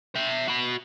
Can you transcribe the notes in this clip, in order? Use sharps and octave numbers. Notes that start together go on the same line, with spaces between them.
E5 G5
F#4 B5